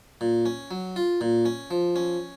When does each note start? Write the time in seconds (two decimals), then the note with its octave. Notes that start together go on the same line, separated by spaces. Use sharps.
0.21 A#2
0.46 C#4
0.71 F#3
0.96 F4
1.21 A#2
1.45 C#4
1.71 F3
1.96 C#4